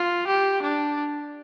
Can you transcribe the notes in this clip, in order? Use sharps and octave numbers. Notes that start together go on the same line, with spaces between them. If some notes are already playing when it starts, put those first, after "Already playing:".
Already playing: F4
G4
D4